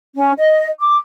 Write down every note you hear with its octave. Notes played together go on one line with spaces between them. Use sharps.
C#4
D#5
D6